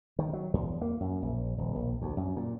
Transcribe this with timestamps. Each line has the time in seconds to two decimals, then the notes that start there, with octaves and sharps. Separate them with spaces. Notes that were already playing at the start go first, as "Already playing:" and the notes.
0.19 D#3
0.33 F#3
0.54 E2
0.81 A#3
1.01 F#2
1.22 A#1
1.58 D#1
1.75 A#1
2.02 D2
2.17 F#2
2.37 A#2